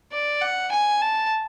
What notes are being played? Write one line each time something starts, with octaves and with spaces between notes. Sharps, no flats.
D5
F#5
G#5
A5